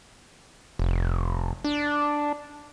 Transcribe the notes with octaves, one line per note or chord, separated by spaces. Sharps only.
F1
D4